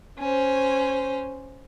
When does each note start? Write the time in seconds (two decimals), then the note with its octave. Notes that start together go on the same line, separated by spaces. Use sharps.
0.18 C#4 C5